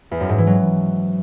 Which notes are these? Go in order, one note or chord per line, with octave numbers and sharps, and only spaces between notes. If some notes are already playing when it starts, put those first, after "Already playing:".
E2
F#2
G#2
E3
F#3